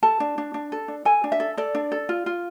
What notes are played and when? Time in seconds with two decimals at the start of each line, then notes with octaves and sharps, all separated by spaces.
0.03 A4 A5
0.20 D4
0.38 D4
0.54 D4
0.72 A4
0.88 D4
1.05 A4 G#5
1.24 D4
1.32 E5
1.40 A4
1.57 A4 D5
1.75 D4
1.92 A4
2.09 F4
2.26 F4